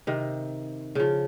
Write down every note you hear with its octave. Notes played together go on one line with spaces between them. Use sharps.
C3 D#3
C#3 F3